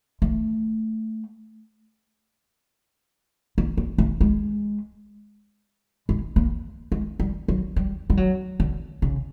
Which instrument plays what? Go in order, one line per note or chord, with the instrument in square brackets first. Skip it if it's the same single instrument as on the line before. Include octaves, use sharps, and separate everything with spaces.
[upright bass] A3
A#3
A#3
A3
G#3
G#3
A#3
G#3
G3
F#3
G3
G3
F#3
D3
C#3